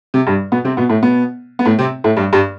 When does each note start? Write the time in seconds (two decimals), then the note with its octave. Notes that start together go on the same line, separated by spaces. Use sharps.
0.14 C3
0.27 G2 G3
0.52 B2 B3
0.65 C3 C4
0.77 B2 B3
0.89 A2 A3
1.02 B2 B3
1.59 B3
1.65 A2 A3
1.79 C3 C4
2.04 A2 A3
2.16 G2 G3
2.33 G2 G3